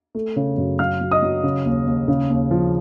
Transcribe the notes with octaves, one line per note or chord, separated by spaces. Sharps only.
A3
C#3
F#2
F#3 F5 F6
F#3
D#5 D#6
F#3
C#3
D#2
D#2
C#3
D#2
F3